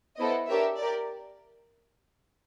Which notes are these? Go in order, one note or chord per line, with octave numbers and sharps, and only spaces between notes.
B3 E4 A4 C5 D#5
D4 G4 A#4 C#5 E5
G4 A#4 D5